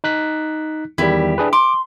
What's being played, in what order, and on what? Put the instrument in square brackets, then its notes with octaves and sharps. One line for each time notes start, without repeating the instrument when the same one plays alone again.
[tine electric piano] D#4 F#6 B6
[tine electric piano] E2 D#3 G3 [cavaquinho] E4 G4
[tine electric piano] D4 G#4 B4
[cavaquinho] C6 [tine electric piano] D6